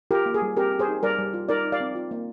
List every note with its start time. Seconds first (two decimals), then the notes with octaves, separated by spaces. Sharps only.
0.11 F4 G4 A#4
0.26 A#3
0.34 G#4
0.42 G3
0.56 C4 G4 A#4
0.72 G4
0.79 G#4 C5
0.88 D#4
1.03 G3 A#4 D5
1.18 G3
1.34 F4
1.49 D#4 A#4 D5
1.65 D#4
1.72 D5 F5
1.80 C4
1.95 F4
2.11 A#3